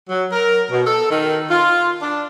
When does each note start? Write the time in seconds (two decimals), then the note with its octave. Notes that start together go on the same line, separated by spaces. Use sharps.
0.10 F#3
0.32 A#4
0.71 B2
0.86 A4
1.10 D#3
1.50 F4
2.02 D4